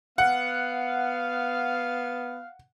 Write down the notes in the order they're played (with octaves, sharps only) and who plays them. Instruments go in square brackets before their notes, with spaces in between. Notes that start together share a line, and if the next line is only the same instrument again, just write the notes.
[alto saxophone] B3 [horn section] F5 [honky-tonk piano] F#5